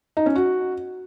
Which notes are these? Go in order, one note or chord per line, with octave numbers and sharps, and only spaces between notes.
D#4
C#4
F#4